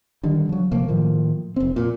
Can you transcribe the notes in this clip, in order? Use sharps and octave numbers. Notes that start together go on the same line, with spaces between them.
D3 D#3 G3
F3 F#3
C3 F3 A3 A#3
A2 D#3 F3 A#3
F1 C4
A#2